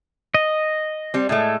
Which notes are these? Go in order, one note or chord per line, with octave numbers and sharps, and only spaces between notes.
D#5
G3 C4
A2 G#3 A3